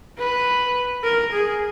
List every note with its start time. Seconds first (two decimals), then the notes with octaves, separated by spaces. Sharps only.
0.18 B4
1.04 A#4
1.32 G#4